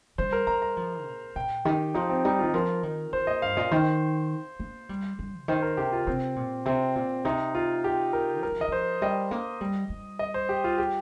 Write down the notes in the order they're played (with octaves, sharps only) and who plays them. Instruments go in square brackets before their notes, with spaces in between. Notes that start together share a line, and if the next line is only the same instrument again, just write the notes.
[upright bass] G3 [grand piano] C5
[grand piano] A#4
[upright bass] G3 [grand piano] A#5
[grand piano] A#5
[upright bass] F3
A#2
[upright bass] A#2 [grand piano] G5
[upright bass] D#3 [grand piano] G4
[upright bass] F3 [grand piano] D#4
[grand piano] C4
[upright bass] G3 [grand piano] D#4
[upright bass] D#3 [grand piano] F4
[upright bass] F3 [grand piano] A#4
[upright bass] D#3
[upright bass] D#3 [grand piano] C5
[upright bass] A#2 [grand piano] D#5
[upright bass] G2 [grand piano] F5
[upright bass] A#2 [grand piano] D#5
[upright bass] D#3 [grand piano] C5
[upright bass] A#3
G3
G3
C3
[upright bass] D#3 [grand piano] C5
[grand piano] A#4
[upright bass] C3 [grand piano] G4
[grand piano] F4
[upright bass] C3 [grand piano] C4
[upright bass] A#2
[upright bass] C3 [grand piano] C4
[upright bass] A#2
[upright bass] C3 [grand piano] D#4
[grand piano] F4
G4
A#4
[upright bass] G3 [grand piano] A#4
[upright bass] F3
[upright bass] D#3 [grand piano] D#5
[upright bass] F3 [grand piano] C5
[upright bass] G3 [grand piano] D#5
[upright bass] A#3
G3
G3
[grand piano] D#5
C5
G4
F4
G4